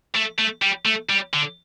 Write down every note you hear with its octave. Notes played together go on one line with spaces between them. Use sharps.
A3
A3
G3
A3
G3
D3